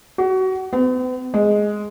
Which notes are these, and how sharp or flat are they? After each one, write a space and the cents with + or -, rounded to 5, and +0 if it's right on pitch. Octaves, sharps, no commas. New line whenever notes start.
F#4 +25
B3 +45
G#3 +0